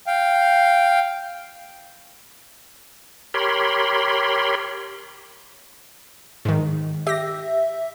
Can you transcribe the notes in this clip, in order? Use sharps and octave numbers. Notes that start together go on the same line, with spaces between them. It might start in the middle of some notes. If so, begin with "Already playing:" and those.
F5 G5
G4 A#4 C#5 B5 C6
G#2 D#3
G4 E5 A#6